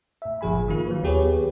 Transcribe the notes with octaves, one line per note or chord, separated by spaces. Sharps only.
A2 E5
G1 A#2 F3 G#4 G#5 B5
D#3 A#3 F4
F#3 B4
D#2 B3 G4 G#4 B4 C#5